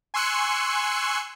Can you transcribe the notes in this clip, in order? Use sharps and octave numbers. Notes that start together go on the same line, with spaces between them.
G#5 C6 C#6 E6 F#6 C#7